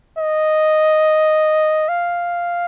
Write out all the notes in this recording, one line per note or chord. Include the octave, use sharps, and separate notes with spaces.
D#5
F5